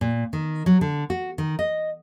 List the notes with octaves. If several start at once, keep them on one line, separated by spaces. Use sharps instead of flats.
A#2
D#3
F#3
D3
F#4
D#3
D#5